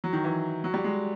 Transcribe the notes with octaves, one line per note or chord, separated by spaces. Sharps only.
F#3
D#3
E3
F#3
G3
G#3